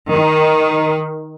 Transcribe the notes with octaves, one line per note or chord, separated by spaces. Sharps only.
D#3